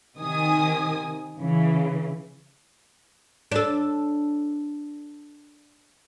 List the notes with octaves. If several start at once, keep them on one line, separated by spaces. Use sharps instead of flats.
C3 D#3 G#5 D#6
C#3 E3
D4 A4